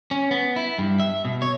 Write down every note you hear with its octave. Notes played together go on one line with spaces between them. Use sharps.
C#4
B3
E4
G2
E5
B2
C#5